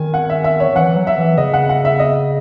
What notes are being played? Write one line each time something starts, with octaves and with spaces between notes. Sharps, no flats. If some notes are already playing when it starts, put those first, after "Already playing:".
Already playing: D#3 G#5
F#5
E5
E5
C#5
E3 F#5
E3
F#3
E5
E3
C#3 D#5
F#5
F#5
E5
D#5